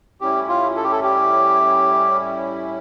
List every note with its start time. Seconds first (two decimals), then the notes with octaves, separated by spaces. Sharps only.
0.21 A2 G3 C#4 E4 G4
0.49 F4
0.76 A4
0.84 G4
0.92 A4
1.03 G4